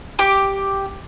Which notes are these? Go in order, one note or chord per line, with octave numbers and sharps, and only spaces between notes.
G4 D6